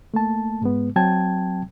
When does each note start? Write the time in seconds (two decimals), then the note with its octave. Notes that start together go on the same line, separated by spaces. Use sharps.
0.14 A3 A#3 A5
0.62 G#2 G#3 B3
0.96 F#3 C4 G5 A5 G#6